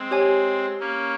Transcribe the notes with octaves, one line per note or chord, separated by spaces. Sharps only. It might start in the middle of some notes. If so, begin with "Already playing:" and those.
Already playing: G#3 C4
G4 C#5 G#5
A#3 C#4